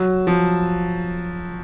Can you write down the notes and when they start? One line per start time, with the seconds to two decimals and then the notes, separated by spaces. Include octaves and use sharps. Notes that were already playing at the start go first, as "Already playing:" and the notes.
Already playing: F#3
0.27 F3